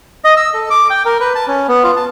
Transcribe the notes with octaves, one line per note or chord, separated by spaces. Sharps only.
D#5
E6
A4
D6
G5
A#4
B4
A5
C#4
B3
F4
A5